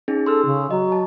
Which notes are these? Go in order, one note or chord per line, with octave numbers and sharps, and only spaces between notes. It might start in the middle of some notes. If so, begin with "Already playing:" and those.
C#4 D#4 G#4
A4 C6 E6 F6
C#3
F#3 D#5
A5